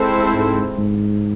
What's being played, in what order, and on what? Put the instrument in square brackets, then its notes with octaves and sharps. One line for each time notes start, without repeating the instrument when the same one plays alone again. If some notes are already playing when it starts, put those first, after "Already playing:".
Already playing: [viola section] G#3 C4 E4 A4 C5
[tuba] G#2
G#2